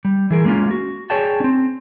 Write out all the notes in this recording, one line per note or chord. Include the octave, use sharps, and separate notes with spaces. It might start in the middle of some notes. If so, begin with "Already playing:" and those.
G3
E3 G#4 A#4
G#3 A#3 C4 C#4 F4
F#4
G#4 C#5 D5 G5 A5
C4 C#4